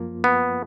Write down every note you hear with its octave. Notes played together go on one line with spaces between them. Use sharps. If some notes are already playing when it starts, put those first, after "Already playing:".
Already playing: F#2 F3 A#3 F4
B3